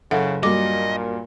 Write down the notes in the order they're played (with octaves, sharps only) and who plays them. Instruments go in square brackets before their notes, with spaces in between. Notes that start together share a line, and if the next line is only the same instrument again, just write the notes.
[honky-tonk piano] F#1 [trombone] C#3 [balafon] A4 E5 F#5
[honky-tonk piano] G2 F#3 A#3 [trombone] A#2 [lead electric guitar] D#5 [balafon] D6